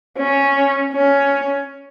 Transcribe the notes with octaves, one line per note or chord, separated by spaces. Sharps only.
C#4
C#4